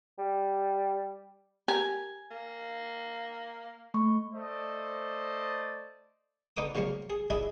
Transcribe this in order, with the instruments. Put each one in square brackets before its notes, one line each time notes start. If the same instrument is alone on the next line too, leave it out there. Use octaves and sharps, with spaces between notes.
[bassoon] G3
[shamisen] G4 A#4 [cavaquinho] G#5
[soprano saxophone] A#3
[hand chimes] A3 C#6
[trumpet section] A3 C5 D5 D#5
[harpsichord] D3 D#4 B4 D6 D#6
A#2 C#3 F3 F#3 A#3
G#4
D4 E4 G#4 D#5 E5